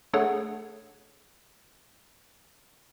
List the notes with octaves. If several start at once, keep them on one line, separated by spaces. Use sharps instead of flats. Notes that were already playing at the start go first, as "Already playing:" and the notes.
A3 D4 G#4 A4 C#5 F#5